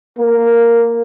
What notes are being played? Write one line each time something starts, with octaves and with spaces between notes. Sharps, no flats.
A#3